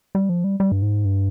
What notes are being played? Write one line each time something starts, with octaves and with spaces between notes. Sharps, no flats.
G3
F3
G3
G3
G2
G#2
G2